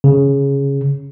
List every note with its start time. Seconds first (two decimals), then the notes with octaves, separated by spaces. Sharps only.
0.04 C#3